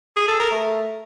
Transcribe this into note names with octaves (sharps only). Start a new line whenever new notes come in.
G#4
A4
A#4
A3